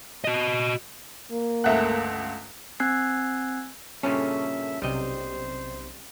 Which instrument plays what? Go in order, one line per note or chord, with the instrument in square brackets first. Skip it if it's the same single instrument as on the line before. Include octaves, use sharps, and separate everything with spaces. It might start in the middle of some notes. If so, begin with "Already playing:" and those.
[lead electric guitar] F#4 D#5
[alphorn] A#3
[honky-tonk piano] G1 C#2 F#6 [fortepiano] A3 E5 F#5
[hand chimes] C4 G#5 E6 F#6 G#6 C7
[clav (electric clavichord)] G2 A#2 C#3 [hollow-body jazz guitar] C#4 [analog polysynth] A4 [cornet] E5
[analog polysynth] B1 C3 [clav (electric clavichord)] G3 D#5 [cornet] C5